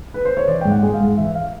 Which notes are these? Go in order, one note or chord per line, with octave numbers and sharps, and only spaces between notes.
B4
C5
C#5
E3 D5
G#2 G5
F#5
G#3
F5
G#2
E3 E5
F5